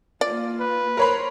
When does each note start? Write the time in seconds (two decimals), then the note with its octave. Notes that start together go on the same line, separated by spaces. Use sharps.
0.21 A#3 F4 D5
0.61 B4
0.97 A#4 C5 C#5 B5